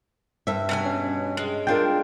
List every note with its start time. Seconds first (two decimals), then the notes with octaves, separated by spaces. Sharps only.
0.47 G2 E5
0.69 B2 A#4 G#5
0.86 C#4
1.37 G#3
1.67 D4 F4 A#4 G5